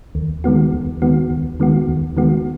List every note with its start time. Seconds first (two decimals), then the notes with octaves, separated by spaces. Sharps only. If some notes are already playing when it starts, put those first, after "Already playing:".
0.15 D#2
0.44 D#3 G#3 B3 F#4
0.73 D#2
1.02 D#3 G#3 B3 F#4
1.30 D#2
1.60 D#3 G#3 B3 F#4
1.88 D#2
2.17 D#3 G#3 B3 F#4